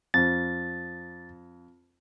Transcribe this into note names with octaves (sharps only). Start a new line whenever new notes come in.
F2 A6